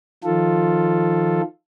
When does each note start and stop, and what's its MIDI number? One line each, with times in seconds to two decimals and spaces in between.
0.24 1.42 51
0.24 1.42 53
0.24 1.42 65
0.24 1.42 69